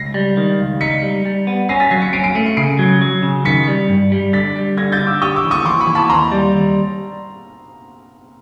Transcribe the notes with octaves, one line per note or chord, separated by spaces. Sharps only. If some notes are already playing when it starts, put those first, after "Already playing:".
Already playing: C#2 A#6 C7
G3
D#3
C#2
D#4 B6 C#7
G3
G3
B3
C#4 A#6 C7
A6 B6
F#3 A#6 C7
B6 C#7
C#4 C7 D7
C7 D7
A3 C#7 D#7
C#7 D#7
C#3 C7 D7
F#3
F#3
C#3
D#3 B6 C#7
G3
G2
G3
D3 A6 B6
G3
D3 G#6 A#6
G6 A6
D3
D6 E6
G4 C#6 D#6
D6 E6
E3
C#6 D#6
E3 C6 D6
B5 C#6
E3
A5 B5
D#2 A#5 C6
G3
D#2